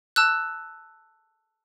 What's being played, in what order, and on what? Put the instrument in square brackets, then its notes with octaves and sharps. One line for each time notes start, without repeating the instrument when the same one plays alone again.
[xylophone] A5 E6 F#6